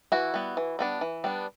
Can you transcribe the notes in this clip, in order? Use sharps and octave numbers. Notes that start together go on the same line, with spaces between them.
E3 E4 F#4
G3 B3
E3
G3 B3 D4
E3
G3 B3 D4